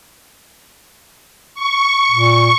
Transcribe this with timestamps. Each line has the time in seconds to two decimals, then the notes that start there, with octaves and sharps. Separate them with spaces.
1.54 C#6
2.12 A#2